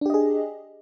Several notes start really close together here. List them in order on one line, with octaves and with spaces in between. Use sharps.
D4 G4 D#5 G#4